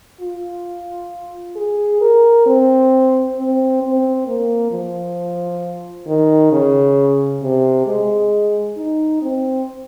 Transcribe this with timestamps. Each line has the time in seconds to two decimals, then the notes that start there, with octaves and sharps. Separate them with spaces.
0.21 F4
1.56 G#4
2.01 A#4
2.46 C4
3.37 C4
3.82 C4
4.27 A#3
4.71 F3
6.07 D#3
6.52 C#3
7.42 C3
7.87 G#3
8.77 D#4
9.22 C4